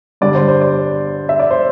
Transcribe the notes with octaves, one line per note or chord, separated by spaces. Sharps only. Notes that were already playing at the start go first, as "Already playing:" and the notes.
G2 D3 G3 D5
C5
C5
D5
E5
D5
C5